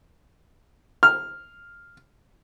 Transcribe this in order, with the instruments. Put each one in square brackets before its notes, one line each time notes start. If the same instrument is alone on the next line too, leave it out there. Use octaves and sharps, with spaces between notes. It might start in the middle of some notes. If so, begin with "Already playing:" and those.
[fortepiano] F6